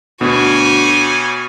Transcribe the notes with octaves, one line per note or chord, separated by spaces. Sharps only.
D2 B2 G3 F#4 C#5 G#5